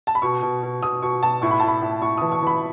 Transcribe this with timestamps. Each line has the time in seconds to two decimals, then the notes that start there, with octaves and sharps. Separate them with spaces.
0.07 A5
0.15 B5
0.22 B2 C#6
0.42 B2
0.63 B2
0.82 B2 D#6
1.02 B2 C#6
1.22 B2 A5
1.42 A2 C#6
1.51 B5
1.60 A2 A5
1.68 B5
1.82 A2
2.01 A2 C#6
2.18 E3 D#6
2.32 C#6
2.42 E3 B5